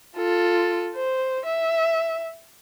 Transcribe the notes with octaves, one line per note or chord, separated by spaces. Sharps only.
F4 A4
C5
E5